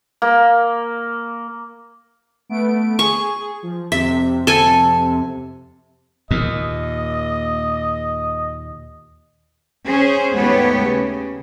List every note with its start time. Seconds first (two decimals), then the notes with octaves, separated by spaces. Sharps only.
0.22 A#3
2.49 A3 B3 D7
2.99 G#4 C#6
3.63 F3
3.92 F2 C3 E5
4.47 A4 G#5
6.31 D#2 A#2 D#5
9.86 C#4 G#4 C5
10.35 D#2 G#2 A3 B3 G4 C#5
10.82 C#3